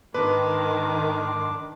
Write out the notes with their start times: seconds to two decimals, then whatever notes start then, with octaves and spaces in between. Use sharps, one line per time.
0.14 G#2 D#3 D4 B4 C6 D6